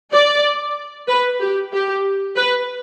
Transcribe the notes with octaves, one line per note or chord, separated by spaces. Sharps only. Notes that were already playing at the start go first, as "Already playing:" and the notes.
D5
B4
G4
G4
B4